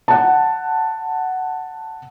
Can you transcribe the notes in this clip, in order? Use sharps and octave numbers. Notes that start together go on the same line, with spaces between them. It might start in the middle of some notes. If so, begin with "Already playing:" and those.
F#5 A5